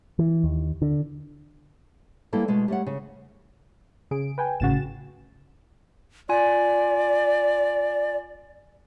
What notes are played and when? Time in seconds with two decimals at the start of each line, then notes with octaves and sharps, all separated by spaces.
0.19 E3
0.44 D#2
0.82 D3
2.33 G3 A#3 E4 A4 B4 A5
2.48 B2 G#3 A3
2.68 G3 A3 C#5 F#5
2.87 C#3
4.11 C#3 G#4 D7
4.38 B4 G5 G#5
4.60 G#1 A2 C#3 F#4 A6 E7
6.29 F4 D5 G#5